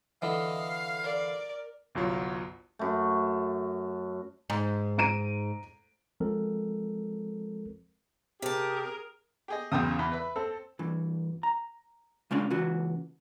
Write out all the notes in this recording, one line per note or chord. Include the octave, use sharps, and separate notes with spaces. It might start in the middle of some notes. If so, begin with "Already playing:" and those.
D3 E3 D#5 F5
A#4 D5
G1 C2 F#3 F4 C#5
F#2 A3
G#2
A#5 D7 D#7
F3 G#3 C4 A4 A#4
C3 G4 G#4 A#4 A5
G4 G#4 D#5
B1 E2 C#3 G5 D#6
E2 B5
B4 E5
C4 A4
G2 E3
A#5
C#3 G#3 C#4 D4
C#2 E3 F#4